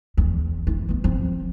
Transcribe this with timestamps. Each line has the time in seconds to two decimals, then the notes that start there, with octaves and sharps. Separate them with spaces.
0.17 E2
0.67 E4
0.89 E3 B3
1.04 F3 C4